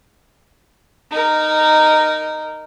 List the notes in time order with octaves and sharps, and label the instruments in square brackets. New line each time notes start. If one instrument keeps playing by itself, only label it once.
[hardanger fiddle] D#4 A#4